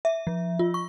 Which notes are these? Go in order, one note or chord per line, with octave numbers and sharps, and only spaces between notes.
E5
F3
F4
C#6